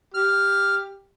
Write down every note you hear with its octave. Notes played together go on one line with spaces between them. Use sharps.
G4 F6